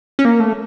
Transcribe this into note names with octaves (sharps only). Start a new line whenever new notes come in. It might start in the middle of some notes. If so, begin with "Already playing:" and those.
C#4
A#3
A3